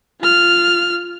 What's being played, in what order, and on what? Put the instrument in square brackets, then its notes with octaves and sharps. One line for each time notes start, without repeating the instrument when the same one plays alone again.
[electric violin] F4 F6